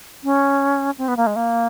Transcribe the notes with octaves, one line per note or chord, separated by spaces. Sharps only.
C#4
C4
B3
A#3
G#3
A#3